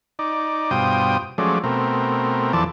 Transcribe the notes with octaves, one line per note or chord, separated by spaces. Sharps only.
D#4 D5
G2 B2 F4 C5 G5 D#6
F3 F#3 G#3 A3 C#4 D5
B2 A3 C4 A#4
E2 E3 F3 A4 D5 A5